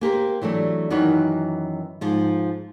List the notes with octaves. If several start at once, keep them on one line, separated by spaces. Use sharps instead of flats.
A#3 G4 A#4 C5
E3 F#3 A3 D4
F#2 D#3 E3 F#4 B4 C#5
G#2 F3